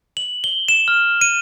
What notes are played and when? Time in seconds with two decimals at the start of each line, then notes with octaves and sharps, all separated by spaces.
0.17 F#7
0.44 G7
0.68 E7
0.88 F6
1.21 D#7